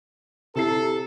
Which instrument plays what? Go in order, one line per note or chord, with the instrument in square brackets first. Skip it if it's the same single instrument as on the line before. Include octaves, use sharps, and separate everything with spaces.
[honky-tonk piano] C3 E4 C7 [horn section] A4